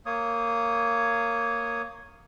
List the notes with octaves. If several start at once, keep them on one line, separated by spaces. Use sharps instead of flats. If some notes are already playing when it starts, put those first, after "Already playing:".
A#3 C#5 D#6